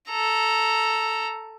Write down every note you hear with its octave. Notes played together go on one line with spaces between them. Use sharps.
A4 A#5